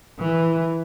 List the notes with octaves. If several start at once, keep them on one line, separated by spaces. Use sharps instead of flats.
E3